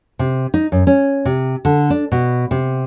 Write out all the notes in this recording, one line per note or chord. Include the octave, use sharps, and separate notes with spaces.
C3
D#4
F#2
C#4
C3
D3
D4
B2
C3